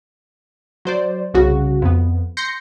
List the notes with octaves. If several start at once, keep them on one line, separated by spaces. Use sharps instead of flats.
F#3 C5 D5
C2 C#3 F#4
F2 B3
C6 G6 A#6 C7 C#7